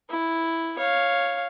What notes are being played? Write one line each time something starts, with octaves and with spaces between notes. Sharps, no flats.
E4
C#5 F5